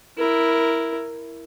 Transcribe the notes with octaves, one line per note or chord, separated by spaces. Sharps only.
E4 A#4